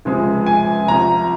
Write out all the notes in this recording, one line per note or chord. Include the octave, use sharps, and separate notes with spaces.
C#2 C3 F3 G#3
G#5
C2 C3 F3 A#5